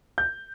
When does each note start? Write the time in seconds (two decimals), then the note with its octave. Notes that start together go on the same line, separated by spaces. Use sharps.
0.18 G6